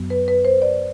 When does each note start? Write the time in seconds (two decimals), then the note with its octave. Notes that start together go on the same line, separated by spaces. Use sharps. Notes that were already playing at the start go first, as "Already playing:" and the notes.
Already playing: F#2 F#3 B3
0.10 B4
0.28 B4
0.45 C5
0.62 D5